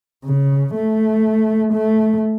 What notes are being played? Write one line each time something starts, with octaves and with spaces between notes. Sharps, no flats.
C#3
A3
A3